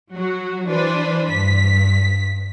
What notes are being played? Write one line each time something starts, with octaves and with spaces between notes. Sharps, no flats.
F#3 F#4
E3 D4 B4 C5
G2 B6